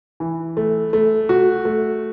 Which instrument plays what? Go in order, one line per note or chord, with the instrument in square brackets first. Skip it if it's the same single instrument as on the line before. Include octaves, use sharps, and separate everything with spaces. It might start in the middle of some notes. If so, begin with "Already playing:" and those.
[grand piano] E3
A3
A3
F#4
A3